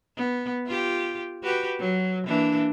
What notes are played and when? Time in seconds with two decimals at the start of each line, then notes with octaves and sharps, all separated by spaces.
0.17 B3
0.67 F4 G4
1.43 F#4 G4 B4
1.80 F#3
2.26 E3 A#3 D4